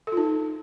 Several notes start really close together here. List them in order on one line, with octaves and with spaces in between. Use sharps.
A4 F4 D#4